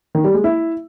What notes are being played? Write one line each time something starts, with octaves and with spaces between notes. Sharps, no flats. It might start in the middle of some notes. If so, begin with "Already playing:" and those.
D#3
G3
G#3
E4